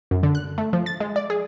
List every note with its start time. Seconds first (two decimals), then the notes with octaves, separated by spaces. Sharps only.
0.11 F#2
0.23 D3
0.35 F#6
0.58 A3
0.73 F3
0.86 A6
1.00 G#3
1.16 D5
1.30 G#4